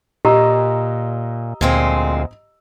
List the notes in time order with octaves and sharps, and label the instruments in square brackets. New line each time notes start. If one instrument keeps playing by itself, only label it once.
[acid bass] A#2 [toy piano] G4 [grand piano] D#5 A#5 E6
[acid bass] D2 [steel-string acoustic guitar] A#2 G#3 C4